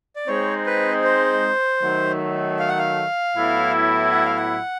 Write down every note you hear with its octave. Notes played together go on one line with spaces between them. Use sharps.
D5
G#3 C4 D#4 C#5
B4
C5
D#3 F#3 A3
F5
F#5
F5
A2 F#3 B3 E4
F#5
F5
F#5